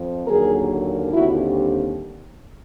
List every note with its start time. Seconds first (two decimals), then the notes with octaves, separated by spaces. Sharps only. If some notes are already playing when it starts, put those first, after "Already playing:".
Already playing: F2 F3
0.26 D#2 D3 F#3 A#3 G#4 A#4
1.12 D#2 D3 G3 C4 E4 F#4